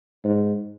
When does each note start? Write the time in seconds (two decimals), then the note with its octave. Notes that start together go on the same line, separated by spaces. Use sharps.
0.24 G#2